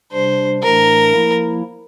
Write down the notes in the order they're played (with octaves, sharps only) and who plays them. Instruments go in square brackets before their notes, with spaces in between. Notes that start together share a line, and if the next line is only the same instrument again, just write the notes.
[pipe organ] C3 G3 D4 [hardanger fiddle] C5
[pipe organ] A2 E3 A3 D4 [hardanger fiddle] A#4
[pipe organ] F3 A#3 E4